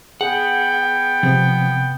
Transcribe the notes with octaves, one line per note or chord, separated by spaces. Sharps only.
B3 G#4 F#5 G5
C3 F3